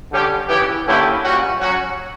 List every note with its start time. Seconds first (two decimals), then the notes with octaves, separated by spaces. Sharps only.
0.11 D3 G3 C#4 G4
0.48 C#3 E3 B3 E4 G4
0.86 D3 A#3 C#4 E4 G4
1.23 A#2 G3 C#4 F#4
1.60 F#3 C#4 F#4